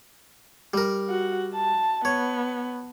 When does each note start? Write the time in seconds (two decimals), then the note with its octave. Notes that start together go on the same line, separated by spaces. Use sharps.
0.74 G3 A#4
1.09 F#4
1.55 A5
2.05 B3 C#5